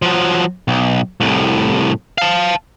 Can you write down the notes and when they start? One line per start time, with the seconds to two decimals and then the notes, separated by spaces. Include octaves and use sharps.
0.02 F3 F#3
0.68 B1
1.21 C2 A2
2.18 F5 A5